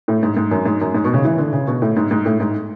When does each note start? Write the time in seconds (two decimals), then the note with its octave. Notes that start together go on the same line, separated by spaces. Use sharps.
0.08 A2
0.23 G#2
0.37 G#2
0.51 F#2
0.65 G#2
0.81 F#2
0.94 G#2
1.05 B2
1.14 C#3
1.25 E3
1.38 D3
1.53 C#3
1.67 B2
1.82 A2
1.97 G#2
2.11 G#2
2.25 A2
2.40 G#2